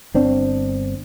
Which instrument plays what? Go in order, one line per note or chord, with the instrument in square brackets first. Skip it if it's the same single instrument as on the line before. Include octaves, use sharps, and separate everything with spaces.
[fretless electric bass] G1 C4 D4